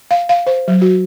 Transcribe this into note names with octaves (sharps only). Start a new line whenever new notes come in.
F5
F5
C5
F#3
F#4